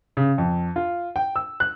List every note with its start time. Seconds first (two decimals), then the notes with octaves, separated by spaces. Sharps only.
0.17 C#3
0.38 F2
0.76 F4
1.16 G5
1.36 E6
1.60 F#6